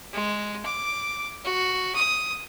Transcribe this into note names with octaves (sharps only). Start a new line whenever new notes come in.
G#3
D6
F#4
D#6